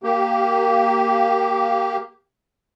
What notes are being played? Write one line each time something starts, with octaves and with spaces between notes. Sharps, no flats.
A#3 G4